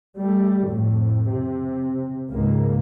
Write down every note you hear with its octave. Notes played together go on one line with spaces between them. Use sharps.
G3 A3
F2 A2
C3
C#2 G#2 A#3